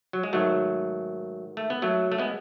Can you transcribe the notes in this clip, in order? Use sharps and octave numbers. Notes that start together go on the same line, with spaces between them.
F#3
G#3
G#2 D#3 F#3 A3
A3
B3
F#3 A3
A3
G#3 B3